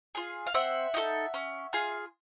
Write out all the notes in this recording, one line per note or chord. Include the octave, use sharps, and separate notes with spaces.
F4 G#4
F5
C4 E5 F#5
D#4 F#4 A4
C#4
F4 G#4